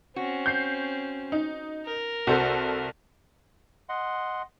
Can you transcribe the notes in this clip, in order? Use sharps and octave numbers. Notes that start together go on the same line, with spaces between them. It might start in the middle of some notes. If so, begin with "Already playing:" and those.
C4 C#4 F#4
G6 C7
D#4
A#4
C2 F#4 A4 C5
D#5 F#5 C6